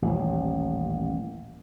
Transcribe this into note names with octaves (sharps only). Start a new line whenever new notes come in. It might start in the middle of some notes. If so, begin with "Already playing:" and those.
D#1 A1